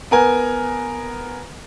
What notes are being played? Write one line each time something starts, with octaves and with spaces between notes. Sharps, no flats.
B3 A#4 G#5